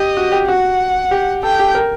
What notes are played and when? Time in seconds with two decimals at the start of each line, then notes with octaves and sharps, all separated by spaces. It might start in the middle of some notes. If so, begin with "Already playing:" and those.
Already playing: G4 D#5
0.17 F#4
0.32 G4
0.47 F#4 F#5
1.11 G4
1.43 A4 G5
1.59 G4
1.75 A#4